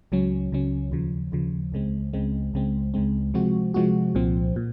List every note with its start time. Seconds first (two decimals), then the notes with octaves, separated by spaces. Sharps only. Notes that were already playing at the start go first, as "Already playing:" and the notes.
0.12 C#2 C#3 F#3 C#4
0.52 C#2 C#3 F#3 C#4
0.92 D#2 C#3 F3
1.32 D#2 C#3 F3
1.72 C#2 C#3 G#3 C4
2.13 C#2 C#3 G#3 C4
2.53 C#2 C#3 G#3 C4
2.94 C#2 C#3 G#3 C4
3.34 C3 F3 G#3 C4 F#4
3.74 C3 F3 G#3 C4 F#4
4.15 C2 A#2 F3 C4
4.56 A#2